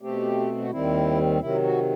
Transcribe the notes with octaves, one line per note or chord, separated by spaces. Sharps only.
B2 A3 C4 G4
F#4
D#2 D#3 G3 C4 E4
C3 D#3 F#3 E4
F#4